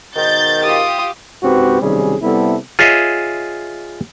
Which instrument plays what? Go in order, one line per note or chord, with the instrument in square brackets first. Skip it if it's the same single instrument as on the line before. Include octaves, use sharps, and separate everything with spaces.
[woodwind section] G#2 B2 D#3 [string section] G6 A6
[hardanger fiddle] F4 D#6 [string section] G4
[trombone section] C#2 G#2 C4 F#4 G4 B4
B1 C3 D#3 G3 C#4 G#4
C3 G3 B3 E4 A4
[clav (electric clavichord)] F4 G#4 C#5 D#5 E5